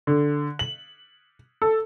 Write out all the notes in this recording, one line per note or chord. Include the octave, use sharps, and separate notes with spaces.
D3
F#7
A4